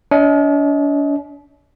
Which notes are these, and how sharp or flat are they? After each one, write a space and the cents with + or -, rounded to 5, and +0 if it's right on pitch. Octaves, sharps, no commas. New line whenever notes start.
D4 -45 D#5 +35